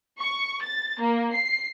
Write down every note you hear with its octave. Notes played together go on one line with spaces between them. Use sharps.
C#6
A6
A#3
C7